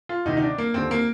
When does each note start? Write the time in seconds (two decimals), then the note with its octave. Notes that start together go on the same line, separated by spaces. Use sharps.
0.09 F4
0.25 D2 C3 D#3 D#4
0.37 D#4
0.42 D4
0.58 A#3
0.74 D#2 D3 C4
0.91 A#3